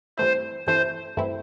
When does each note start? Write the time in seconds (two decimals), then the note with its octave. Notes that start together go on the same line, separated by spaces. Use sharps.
0.18 G2 E3 A3 C4 E4 C5
0.67 G2 E3 A3 C4 E4 C5
1.17 G2 E3 A3 C4 E4